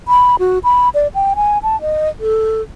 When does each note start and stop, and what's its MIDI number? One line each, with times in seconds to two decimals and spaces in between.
0.08 0.36 83
0.39 0.59 66
0.64 0.89 83
0.94 1.07 74
1.14 1.34 79
1.36 1.58 80
1.63 1.80 81
1.81 2.09 75
2.20 2.62 69